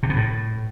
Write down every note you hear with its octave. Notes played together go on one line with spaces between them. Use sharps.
C3
B2
A2